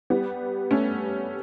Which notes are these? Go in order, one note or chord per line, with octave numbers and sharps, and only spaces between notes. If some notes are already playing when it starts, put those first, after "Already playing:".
G3 B3
A3 C#4